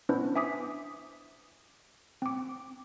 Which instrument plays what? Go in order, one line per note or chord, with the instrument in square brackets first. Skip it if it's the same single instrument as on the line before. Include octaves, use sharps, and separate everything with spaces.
[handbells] B3 C#4 D4 E4 B4 C5
E5 G#5 D6 D#6 B6
C4 D6